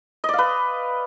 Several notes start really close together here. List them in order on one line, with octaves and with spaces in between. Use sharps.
D#5 D5 F5 B4